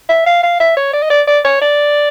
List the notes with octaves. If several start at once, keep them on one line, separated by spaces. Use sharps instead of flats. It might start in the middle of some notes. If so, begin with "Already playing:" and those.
E5
F5
F5
E5
C#5
D5
D#5
D5
D5
C#5
D5